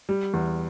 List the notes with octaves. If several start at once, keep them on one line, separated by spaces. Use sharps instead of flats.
G3
E2